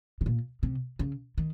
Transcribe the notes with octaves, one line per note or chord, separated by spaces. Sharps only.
C3
A#2
C3
C#3
D#3